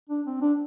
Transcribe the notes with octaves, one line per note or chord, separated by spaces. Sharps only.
D4
C4
D4